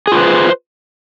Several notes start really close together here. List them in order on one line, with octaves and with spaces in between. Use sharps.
G#4 F4 B4 C5